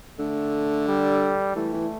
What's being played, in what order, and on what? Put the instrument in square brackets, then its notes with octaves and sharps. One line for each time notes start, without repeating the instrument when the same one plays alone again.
[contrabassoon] D3 [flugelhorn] A3
[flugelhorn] G3
[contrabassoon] E3 [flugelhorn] A3
[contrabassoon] E3